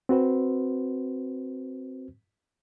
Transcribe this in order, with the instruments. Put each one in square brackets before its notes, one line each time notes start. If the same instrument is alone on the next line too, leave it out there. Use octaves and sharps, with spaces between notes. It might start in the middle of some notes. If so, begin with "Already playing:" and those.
[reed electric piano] C4 F#4 B4 C5